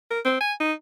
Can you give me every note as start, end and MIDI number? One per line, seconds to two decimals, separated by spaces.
0.11 0.20 70
0.25 0.38 60
0.41 0.53 80
0.60 0.73 63